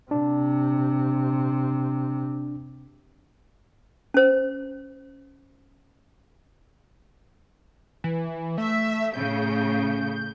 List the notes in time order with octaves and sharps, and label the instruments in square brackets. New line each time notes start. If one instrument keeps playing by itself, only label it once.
[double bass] C3 [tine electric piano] D4
[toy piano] C#4 C5
[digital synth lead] E3
[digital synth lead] A3 [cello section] E5
[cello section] A2 C#3 [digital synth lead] G6